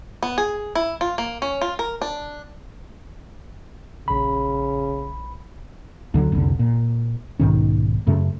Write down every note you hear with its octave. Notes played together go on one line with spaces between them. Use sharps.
B3
G#4
E4
F4
A#3
C#4
F4
A#4
D4
A#1 C#3 B5
D2 D3 D#3 F#3
F1 C2 D3
A#2
B1 G#2 D#3 C#4
F#2 C#3 A3